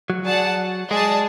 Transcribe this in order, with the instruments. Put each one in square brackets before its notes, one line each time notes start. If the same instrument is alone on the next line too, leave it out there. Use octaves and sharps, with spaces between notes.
[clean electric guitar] F#3
[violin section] G#4 D5 F#5 A5
[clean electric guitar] G#3 [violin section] G#4 D5 A5